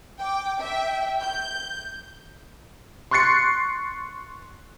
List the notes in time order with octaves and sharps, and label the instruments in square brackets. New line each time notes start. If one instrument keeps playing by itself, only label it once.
[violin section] G5 D6
E5 G5
G6
[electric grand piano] C6 C#6 F#6 A6 C7 C#7